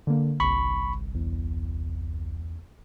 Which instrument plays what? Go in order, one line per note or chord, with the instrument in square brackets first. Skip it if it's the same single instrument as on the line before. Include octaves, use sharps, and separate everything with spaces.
[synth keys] D3 A#3
[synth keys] G1 C2 [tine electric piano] B5 C#6
[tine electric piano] E2